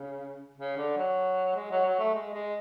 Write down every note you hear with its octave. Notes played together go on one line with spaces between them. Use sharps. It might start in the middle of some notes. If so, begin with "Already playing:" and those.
Already playing: C#3
C#3
D3
F#3
G#3
F#3
F#3
A3
G#3
G#3